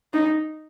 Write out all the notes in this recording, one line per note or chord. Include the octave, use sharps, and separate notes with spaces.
D#4